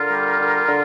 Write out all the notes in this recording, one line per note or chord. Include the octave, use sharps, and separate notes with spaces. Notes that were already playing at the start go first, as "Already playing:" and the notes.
Already playing: D3 F4 A#4
G3
D3
D3